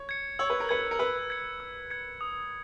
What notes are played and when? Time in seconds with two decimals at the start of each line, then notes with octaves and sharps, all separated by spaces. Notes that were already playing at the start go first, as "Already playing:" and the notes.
Already playing: C#5
0.09 G#6 C#7
0.39 C#5 E6
0.50 B4
0.60 A#4
0.69 B4 G#6 C#7
0.91 A#4
0.99 B4 E6
1.30 G#6 C#7
1.60 E6
1.90 G#6 C#7
2.21 D#6